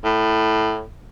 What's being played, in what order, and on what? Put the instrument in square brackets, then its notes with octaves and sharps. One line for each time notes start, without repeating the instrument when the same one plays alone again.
[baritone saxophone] A2